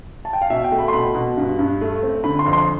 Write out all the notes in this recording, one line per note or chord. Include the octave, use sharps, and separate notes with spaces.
A5
G5
F5
B2 E5
G5
A3
B5
C6
B2 B5
B2
G2
G2
A3
C4
D3 B5
C6
F2
C6